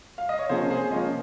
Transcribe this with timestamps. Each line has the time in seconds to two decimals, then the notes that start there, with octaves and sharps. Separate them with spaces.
0.18 F5
0.29 D#5
0.39 C#5
0.49 C3 F3 A#3 C#4 G#4 C5
0.70 G#4 C5
0.90 C3 F3 A#3 C#4 C5 D#5